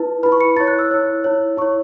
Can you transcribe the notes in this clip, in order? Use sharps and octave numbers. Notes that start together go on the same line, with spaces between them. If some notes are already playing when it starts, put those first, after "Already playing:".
Already playing: E4 B4 A5
E4 B4 B5
C#6
C#7
E4 C#5 A6
F#6
E6
E4 C#5
E4 C#5
E4 C#5 C#6